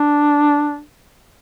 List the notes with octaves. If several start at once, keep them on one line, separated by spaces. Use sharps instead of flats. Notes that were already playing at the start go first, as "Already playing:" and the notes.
Already playing: D4